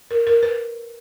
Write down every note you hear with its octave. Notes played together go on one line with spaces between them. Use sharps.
A#4
A#4
B4